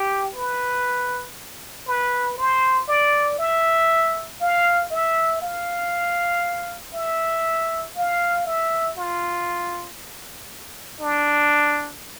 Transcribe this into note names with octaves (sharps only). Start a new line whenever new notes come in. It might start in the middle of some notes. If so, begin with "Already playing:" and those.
Already playing: G4
B4
B4
C5
D5
E5
F5
E5
F5
E5
F5
E5
F4
D4